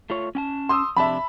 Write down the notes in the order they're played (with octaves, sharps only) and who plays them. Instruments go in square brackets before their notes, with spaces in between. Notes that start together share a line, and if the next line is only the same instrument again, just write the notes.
[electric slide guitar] A3 F4 C#5
C#4 G5 A5
[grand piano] C6 D#6 E6
[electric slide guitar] F2 C3 D4 [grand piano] E5 A5 B5